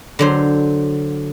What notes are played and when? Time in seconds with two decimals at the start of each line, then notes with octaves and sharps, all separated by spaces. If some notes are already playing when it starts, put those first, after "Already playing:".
0.19 D3 F#3 C5